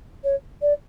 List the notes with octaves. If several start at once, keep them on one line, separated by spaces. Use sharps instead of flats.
C#5
D5